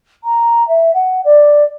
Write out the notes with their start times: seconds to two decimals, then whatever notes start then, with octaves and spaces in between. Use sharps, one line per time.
0.24 A#5
0.67 E5
0.93 F#5
1.24 D5